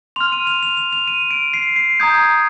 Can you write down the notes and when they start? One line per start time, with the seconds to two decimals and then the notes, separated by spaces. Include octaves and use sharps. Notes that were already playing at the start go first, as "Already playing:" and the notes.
0.16 C6 F6 F7
0.32 D#7
0.47 F7
0.63 F7
0.77 F7
0.93 F7
1.07 D#7
1.31 D7
1.54 C7
1.76 C7
2.00 A#5 D#6 G6 G#6